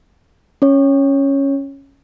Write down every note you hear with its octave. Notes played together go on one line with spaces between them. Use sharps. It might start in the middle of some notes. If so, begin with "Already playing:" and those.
C#4 C#5